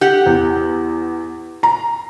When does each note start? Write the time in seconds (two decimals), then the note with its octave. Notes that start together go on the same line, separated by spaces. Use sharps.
0.01 G4 F#5
0.26 E2
1.63 A#5